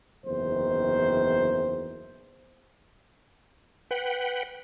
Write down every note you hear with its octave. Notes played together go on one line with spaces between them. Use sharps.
F#1 E2 D#3 C5
B4 F#5 G5